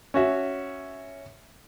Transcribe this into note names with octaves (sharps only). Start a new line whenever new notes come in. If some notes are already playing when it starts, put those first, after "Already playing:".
C#4 F#4 E5